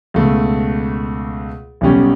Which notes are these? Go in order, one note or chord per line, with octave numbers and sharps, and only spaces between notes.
C#2 B2 A3
B1 B2 G3 C#4